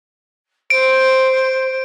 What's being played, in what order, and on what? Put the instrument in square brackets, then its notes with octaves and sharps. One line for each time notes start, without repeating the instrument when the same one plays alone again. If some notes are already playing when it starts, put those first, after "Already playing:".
[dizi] C5 [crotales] D7